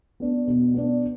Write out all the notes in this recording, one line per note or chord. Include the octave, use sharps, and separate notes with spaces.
B3 D4
B2
B3 D4